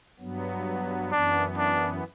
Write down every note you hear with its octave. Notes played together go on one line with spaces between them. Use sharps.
G2 F#3 B3
F#2 E3 B3 D4
D4